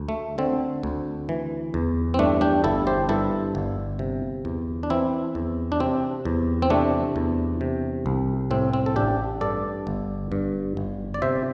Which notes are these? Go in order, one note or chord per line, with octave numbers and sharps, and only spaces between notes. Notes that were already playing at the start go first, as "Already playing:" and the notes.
Already playing: D2
A3
D3 C4
D2
E3
E2
C4
G2 A3 D4
D4 G4
G1 E4 A4
G4 C5
G2 E4 A4
G1
C3
E2
D4
E3 C4 E4
E2
D4
C3 C4
E2
C4
C3 A3 D4
E2
C3
C2
A2 C4
C4
A4
A1 D4 G4
G2 A4 D5
G1
G2
G1
D5
C3 C5 E5